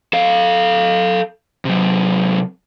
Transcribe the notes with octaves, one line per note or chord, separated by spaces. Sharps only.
A4 F5
C3 F#3